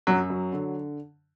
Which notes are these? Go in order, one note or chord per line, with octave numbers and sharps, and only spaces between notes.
F#2 F#3
F#3
D3